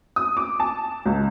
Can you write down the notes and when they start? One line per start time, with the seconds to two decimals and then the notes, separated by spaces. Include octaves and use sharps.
0.16 D#6
0.37 D6
0.60 A5
1.06 C#2